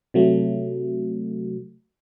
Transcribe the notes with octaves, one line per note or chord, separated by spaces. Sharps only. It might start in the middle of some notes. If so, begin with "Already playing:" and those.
C3 F#3 A3